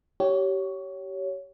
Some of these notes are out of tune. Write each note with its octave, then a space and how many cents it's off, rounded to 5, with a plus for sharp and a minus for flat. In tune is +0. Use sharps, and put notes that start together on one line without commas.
G4 -25 C#5 +10